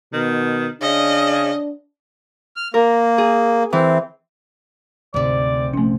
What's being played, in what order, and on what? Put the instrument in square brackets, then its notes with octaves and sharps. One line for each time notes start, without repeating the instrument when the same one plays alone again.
[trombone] B2 [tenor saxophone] D#3
[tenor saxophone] C#3 [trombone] D4 [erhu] D#5
[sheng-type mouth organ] F6
[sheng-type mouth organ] A#3 [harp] A#4
[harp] G#4
[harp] E3 [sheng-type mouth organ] C4
[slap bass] D2 [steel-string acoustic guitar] G#2 C3 [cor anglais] D5
[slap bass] A#1 F3 [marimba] A3 C#4